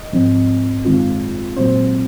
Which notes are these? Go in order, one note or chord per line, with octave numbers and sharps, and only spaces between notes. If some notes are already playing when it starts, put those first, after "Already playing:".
Already playing: D#5
G#2 F3 C4
F#2 D#3 G#3 C4 F4
A#2 F#3 C4 C5